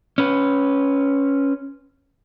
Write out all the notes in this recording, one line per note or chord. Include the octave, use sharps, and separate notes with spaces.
C#4 B4